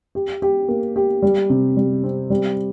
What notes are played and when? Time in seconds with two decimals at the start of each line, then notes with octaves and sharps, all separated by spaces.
0.15 G4
0.42 G4
0.68 A#3
0.96 G4
1.22 G3
1.50 C3
1.77 G3
2.04 C4
2.30 G3